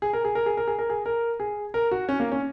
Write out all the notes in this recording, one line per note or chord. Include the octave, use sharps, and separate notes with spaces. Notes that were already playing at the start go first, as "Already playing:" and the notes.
G#4
A#4
G#4
A#4
G#4
A#4
G#4
A#4
G#4
A#4
G#4
A#4
F#4
C#4
A#3
C#4